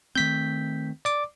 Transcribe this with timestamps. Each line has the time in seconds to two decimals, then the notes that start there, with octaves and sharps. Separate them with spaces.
0.15 D#3 A3 C4 G6 B6
1.05 D5 D6